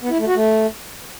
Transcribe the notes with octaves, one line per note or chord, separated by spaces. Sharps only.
B3
E4
A3
F#4
A3